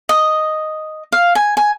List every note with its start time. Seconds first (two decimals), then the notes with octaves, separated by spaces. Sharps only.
0.09 D#5
1.12 F5
1.35 G#5
1.57 G#5